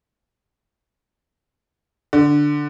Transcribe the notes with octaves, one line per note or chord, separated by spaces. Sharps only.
D3